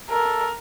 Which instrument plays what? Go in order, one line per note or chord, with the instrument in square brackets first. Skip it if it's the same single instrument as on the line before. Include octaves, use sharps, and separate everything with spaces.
[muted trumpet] A4 [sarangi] A#4